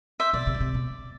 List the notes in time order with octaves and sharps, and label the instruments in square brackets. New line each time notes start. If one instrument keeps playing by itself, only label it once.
[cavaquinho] C5 E5
[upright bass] B2 [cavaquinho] D5
[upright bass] C3
D3
C3
B2